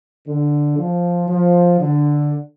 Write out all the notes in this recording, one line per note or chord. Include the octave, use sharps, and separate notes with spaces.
D3
F3
F3
D3